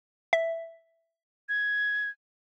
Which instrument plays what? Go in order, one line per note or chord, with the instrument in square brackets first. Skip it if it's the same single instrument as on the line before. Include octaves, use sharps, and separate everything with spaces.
[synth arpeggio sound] E5
[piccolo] G#6